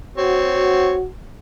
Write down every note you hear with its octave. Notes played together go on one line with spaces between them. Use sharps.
C4 F#4 C#5